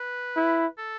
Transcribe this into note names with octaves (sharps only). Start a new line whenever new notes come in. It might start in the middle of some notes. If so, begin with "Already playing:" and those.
Already playing: B4
E4
A4